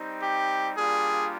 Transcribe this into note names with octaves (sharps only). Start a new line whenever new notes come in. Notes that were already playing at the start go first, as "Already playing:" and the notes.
Already playing: G3 C4 D#4
G4
G3 A#3 D4 F4 G#4